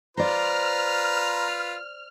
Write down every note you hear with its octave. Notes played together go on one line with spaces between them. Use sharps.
F4 B4 C5 D5 A#5 F6